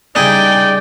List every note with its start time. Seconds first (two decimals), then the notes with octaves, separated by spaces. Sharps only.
0.15 C#3 G3 D#4 E4 G#4 D5 G5